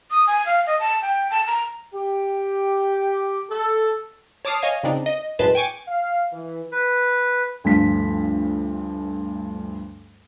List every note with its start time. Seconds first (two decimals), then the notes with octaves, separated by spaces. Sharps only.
0.11 D#6
0.27 G#5
0.46 F5
0.67 D#5
0.80 A5
1.02 G5
1.31 A5
1.47 A#5
1.94 G4
3.50 A4
4.45 C#5 A5 D6 D#6 F6 C7
4.62 C#5 D#5 F5 G#5
4.83 C#3 C4 D4 D#4
5.06 D#5
5.39 F#2 A2 G#3 B4 A5 C6
5.55 G5 G#5 C#6 D6
5.88 F5
6.33 E3
6.72 B4
7.64 D2 G2 F3 B6